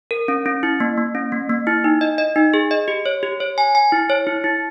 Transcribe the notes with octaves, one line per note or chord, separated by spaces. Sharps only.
A#4
C#4
C#4
E4
A#3
A#3
C#4
A#3
A#3
E4
D#4
D#5
D#5
D#4
G#4
D#5
G4
C#5
G4
C#5
G#5
G#5
E4
C#5
E4
E4